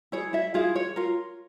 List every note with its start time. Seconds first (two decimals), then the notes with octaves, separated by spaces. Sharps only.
0.12 E4 G#4 C#5
0.33 E4 E5
0.54 E4 F4 G#4 F5
0.75 C#5
0.96 F4 A#4